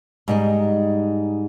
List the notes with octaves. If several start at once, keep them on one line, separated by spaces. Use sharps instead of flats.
G#2 G3 D#4